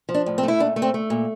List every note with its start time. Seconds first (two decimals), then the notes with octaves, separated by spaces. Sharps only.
0.09 F3
0.14 D4
0.26 A2
0.38 C4
0.43 A3 E4
0.60 A#2 D4
0.76 A3
0.82 C4
0.94 A3
1.10 A#2